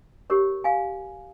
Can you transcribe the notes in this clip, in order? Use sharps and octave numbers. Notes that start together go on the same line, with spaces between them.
G4 A#4 C#5
F5 G#5